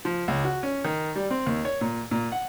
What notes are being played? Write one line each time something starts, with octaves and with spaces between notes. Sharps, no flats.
F3
C#2
F#4
C#4
D#3
G3
C4
D#2
C#5
A#2
A#2
F#5